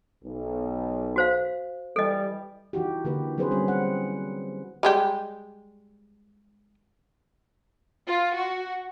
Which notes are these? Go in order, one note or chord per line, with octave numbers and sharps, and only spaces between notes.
B1
F#4 C5 F5
E3 G3 A4 D#5
E3 D#4 F#4 G4
D3 E3 A#3 G4 B4
F#3 C4 G#4 B4 C5
G3 C4 C#4
F#5
G3 G#3 G4
F4
F#4